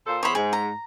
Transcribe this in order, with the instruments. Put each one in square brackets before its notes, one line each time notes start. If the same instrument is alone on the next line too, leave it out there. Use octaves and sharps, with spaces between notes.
[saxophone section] A#2 A4 C5
[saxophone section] E2 G#4 C5 [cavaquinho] C#5 B5
[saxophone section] G#2 [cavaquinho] G#4
[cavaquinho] A#5